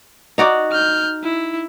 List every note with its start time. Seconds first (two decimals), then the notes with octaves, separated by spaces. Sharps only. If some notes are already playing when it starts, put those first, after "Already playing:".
0.38 D#4 F#4 D5
0.71 F6 G6
1.23 E4